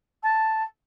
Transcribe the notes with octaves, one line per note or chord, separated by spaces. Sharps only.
A5